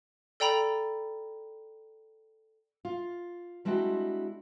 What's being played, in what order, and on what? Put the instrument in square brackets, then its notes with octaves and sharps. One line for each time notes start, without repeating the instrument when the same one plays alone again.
[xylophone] A4 D5 G5 A#5 B5
[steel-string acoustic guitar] F4
G3 G#3 C4 D4 E4 F#4